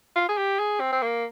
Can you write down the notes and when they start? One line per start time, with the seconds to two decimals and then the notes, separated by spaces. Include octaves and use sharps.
0.16 F4
0.29 G#4
0.37 G4
0.59 G#4
0.80 C4
0.92 C4
1.02 A#3